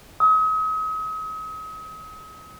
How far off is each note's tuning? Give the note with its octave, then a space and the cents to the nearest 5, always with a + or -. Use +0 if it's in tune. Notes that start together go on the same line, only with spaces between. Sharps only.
D#6 +40